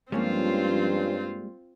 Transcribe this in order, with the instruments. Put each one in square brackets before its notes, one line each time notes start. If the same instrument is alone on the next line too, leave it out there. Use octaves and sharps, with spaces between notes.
[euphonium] G2 [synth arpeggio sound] F3 C#4 [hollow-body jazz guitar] G3 G#3 A#3 [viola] C4 F4